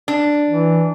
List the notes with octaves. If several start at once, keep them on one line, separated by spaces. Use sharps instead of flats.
D4
E3